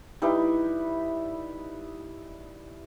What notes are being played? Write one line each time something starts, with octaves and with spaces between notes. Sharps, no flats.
G3 D#4 E4 B4